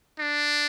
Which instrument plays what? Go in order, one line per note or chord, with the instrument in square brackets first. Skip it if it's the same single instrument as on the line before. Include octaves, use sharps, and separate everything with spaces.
[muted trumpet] D4